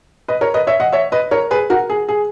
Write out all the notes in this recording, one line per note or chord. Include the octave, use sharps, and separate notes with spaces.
B4 D#5
A#4 C#5
B4 D#5
C#5 E5
D#5 F#5
C#5 E5
B4 D#5
A#4 C#5
G#4 B4
F#4 A#4
G#4
G#4